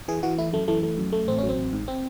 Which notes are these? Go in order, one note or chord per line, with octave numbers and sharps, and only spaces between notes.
E3 G#4
E3 F#4
A3 E4
F#2 A3
E3 A3
A3
F#2
A3
A1 C4
F#3 C#4
C4
A1
G#2
C4